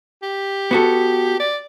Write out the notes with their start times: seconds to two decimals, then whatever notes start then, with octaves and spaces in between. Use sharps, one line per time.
0.23 G4
0.71 B3 F#4 A4
1.40 D5